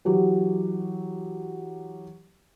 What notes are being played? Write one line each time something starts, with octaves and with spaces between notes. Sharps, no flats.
E3 F#3 G4